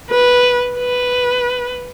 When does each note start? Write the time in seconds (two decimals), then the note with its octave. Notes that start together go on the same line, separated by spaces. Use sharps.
0.10 B4
0.79 B4